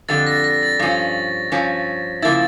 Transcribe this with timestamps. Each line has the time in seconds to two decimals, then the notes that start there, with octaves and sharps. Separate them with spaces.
0.09 F2 D3 G3 A6
0.27 A#6
0.44 A#6
0.63 A6
0.80 G2 F3 C#4
1.52 G2 F3 C#4
2.22 C#3 F3 A#3 E4 A6